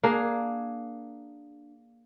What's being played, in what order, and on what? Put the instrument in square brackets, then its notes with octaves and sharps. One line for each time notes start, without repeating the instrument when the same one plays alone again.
[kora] A#3 D4 G#4